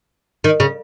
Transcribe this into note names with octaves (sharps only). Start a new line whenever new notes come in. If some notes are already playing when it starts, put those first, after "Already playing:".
D#3
C#3